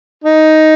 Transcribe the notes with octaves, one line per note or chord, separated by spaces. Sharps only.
D#4